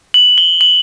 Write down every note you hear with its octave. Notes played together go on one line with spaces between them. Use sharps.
F#7
G7
F#7